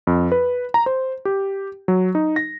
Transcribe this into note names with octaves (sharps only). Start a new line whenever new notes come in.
F2
B4
A#5
C5
G4
F#3
D#4
A#6